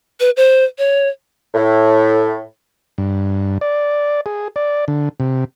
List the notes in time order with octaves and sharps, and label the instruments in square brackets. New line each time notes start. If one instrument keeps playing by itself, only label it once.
[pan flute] B4
C5
C#5
[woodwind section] A2
[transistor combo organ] G2
D5
G#4
D5
D3
C3